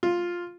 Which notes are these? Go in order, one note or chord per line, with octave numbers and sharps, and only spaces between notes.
F4